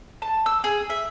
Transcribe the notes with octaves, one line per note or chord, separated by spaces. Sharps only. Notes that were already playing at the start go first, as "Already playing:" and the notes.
A5
E6
G#4
E5